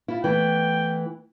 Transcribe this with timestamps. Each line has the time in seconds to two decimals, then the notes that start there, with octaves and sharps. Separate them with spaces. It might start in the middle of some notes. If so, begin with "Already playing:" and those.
0.08 E4 F4
0.24 E3 A3 B3 G5